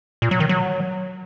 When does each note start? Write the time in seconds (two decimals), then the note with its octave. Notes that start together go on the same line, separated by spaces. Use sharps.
0.22 A#2
0.31 F#3
0.40 D#3
0.49 F#3